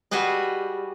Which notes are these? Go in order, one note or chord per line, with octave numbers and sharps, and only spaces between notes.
G3 F#4 G#4 B4 D#5